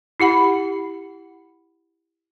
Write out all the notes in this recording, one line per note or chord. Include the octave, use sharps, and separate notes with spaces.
E4 G4 F#5 B5